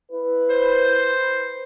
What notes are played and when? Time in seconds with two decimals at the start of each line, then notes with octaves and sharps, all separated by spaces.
0.11 E4 B4
0.50 C5